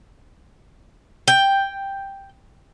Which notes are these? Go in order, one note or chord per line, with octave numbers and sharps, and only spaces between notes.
G5